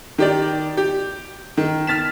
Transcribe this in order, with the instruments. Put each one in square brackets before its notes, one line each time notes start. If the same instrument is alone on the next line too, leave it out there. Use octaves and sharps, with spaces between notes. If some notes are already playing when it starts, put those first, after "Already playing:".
[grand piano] D#3 G4 D5
G4
D#3
F6 A6 B6 E7